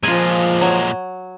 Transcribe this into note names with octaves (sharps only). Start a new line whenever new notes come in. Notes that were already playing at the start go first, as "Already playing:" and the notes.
A#2 F3 G#3 F4 G#5
F#3